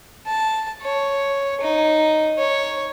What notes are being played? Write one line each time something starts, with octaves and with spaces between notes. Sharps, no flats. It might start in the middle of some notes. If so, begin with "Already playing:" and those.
A5
C#5
D#4
C#5